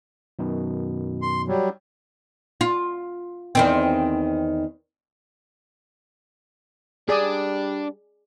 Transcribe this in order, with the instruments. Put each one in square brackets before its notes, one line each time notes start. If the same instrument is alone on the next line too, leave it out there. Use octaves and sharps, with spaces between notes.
[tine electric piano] F#2 B2 D#3
[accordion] C6
F#3 G3
[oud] F4
E2 D#3 C4
[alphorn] G3 [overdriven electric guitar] D4 [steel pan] G#4 D5 D#6